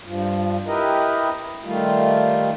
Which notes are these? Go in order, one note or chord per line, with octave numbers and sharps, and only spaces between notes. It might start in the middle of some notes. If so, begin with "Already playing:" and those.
G2 F3
E4 G4 A#4 B4 D#5
D#3 G3 A3 F4